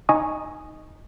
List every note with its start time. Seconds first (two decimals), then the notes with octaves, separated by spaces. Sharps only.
0.09 D#4 D#5 G#5 C#6 D#6